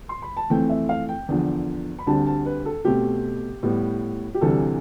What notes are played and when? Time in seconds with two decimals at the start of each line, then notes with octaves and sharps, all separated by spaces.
0.09 C6
0.22 B5
0.37 A5
0.50 F2 E3 A3 C4 G5
0.69 E5
0.89 F5
1.09 G5
1.28 E2 D3 F3
1.99 B5
2.06 D2 D3 G3 C4 A5
2.27 A5
2.46 B4
2.66 A4
2.85 B2 A3 C4 G4
3.63 A2 G3 B3
4.34 G4
4.41 D2 C3 E3 G3 A4